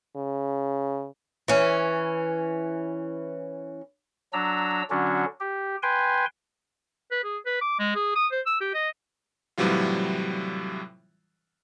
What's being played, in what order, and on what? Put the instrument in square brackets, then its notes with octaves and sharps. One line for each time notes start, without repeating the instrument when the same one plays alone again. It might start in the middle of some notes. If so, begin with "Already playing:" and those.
[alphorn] C#3
[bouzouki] E3 C#4
[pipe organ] F#3 D4 A#5 E6
D3 F#3 C#4 D4 F#4
G4
B4 G5 G#5 C6
[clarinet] B4
G#4
B4
D6
G#3
G#4
D#6
C5
E6
G4
D#5
[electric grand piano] A2 C3 E3 F#3 G3 F4